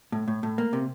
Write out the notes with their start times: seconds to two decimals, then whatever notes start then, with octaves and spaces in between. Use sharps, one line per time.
0.12 A2
0.28 A2
0.43 A2
0.58 A#3
0.73 C3